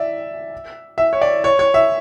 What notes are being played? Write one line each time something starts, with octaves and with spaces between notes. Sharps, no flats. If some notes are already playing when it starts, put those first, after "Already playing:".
Already playing: D5 E5
E5
C#5
D5
C#5
C#5
E5